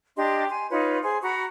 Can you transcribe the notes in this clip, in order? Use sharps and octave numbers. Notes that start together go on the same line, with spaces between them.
D4 G4 D#5 C6
G#5 C6
D#4 F4 B4 C#5
G#4 C5 C6
F#4 A#5 B5 C#6